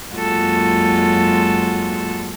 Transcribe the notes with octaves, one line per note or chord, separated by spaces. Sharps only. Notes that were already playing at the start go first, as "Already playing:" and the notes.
F#2 G#3 A#3 F4 F#4 A4